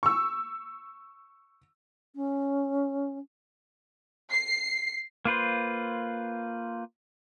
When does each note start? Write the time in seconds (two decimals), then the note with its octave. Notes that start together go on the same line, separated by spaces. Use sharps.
0.03 C#6 E6
2.14 C#4
4.31 C7
5.25 A#3 F4 B4 C5